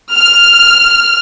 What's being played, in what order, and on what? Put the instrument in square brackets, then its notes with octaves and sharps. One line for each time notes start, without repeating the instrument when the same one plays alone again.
[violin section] F6